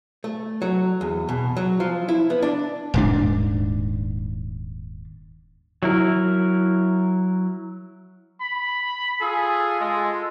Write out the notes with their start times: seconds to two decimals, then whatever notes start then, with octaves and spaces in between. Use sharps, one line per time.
0.24 A3
0.62 F#3
1.01 E2
1.29 B2
1.57 F#3
1.80 F3
2.09 E4
2.30 B3
2.42 D4
2.94 D#1 G#2 D4
5.83 F#3 E4 A#4
8.41 B5
9.21 F4 G#4 A4
9.80 G#3